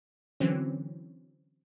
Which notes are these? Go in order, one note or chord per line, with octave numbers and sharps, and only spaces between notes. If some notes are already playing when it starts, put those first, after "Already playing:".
D3 E3 F#3 C4 C#4